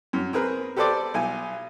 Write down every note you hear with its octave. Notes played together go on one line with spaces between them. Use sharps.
F#2
C4 G#4 A#4 B4
G4 A4 B4 C5 D5 D6
B1 G#5